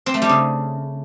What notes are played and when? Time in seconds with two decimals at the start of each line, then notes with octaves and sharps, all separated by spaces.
0.06 C4
0.14 A3
0.22 G3
0.29 C#3